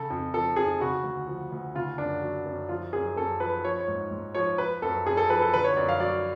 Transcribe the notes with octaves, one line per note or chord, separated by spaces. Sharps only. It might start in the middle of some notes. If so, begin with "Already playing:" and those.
Already playing: C#3 A4
F2
F3 A4
F2 G#4
C#3 F#4
D2
F3
D2
C#3 F4
F#2 D4
F#3
F#2
F3 F4
F#2 G#4
F#2 A4
F3 B4
F3 C#5
C#5
G#2
G#2
F3 C#5
F3 B4
F#2 A4
F#2 G#4
A4
F3 B4
A4
D3 B4
C#5
F#2 D5
F5
F#3 D5